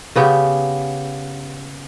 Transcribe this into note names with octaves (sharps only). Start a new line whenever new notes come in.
C#3 B3 G4